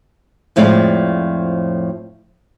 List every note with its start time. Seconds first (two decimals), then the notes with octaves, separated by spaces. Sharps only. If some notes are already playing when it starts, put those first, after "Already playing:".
0.56 F2 A2 F3 G#3 F4 D5